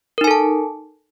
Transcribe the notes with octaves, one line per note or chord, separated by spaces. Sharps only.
D#4 A4 A#4 G#5 A5